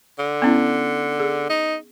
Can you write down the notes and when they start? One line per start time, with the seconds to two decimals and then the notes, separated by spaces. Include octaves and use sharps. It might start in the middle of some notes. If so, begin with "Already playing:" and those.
0.19 D3
0.42 B3 C#4 E4
1.19 G#4
1.50 D#4